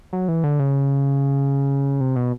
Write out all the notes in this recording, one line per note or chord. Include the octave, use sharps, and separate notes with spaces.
F#3
E3
D3
C#3
C3
B2